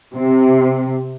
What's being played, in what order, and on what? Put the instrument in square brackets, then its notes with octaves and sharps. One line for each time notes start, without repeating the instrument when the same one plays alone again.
[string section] C3